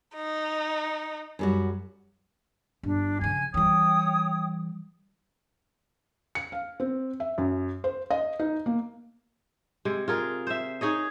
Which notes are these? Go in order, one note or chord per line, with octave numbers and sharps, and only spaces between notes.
D#4
F#2 G3 F#4
G1 D4
C#3 F3 G#5 G#6
E3 G3 C#5 G5 D#6
C#7
F5
C4
E5
F#2
C5
D#5
D#4
A#3
C3 G#3
F4 G#4 A#4
C5 E5
D#4 G#4 C#5 D#5